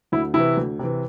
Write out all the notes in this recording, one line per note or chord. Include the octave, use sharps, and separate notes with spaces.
D2 E4
C3 E3 E4
D2
C3 E3